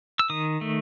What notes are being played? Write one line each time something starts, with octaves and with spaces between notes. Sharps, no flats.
E6
D#3 D#6
A3